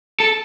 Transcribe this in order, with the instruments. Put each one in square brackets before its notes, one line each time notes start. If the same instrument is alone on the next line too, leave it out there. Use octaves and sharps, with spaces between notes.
[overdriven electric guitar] A4